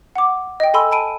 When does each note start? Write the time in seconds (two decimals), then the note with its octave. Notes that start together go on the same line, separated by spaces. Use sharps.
0.16 F#5 D6
0.60 D#5 G5
0.74 A4 G#5 B5 C6 E6
0.91 A5 B5 D7 D#7